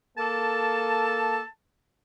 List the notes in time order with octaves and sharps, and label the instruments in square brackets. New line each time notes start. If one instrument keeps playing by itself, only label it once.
[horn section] A#3 A4 [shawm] A5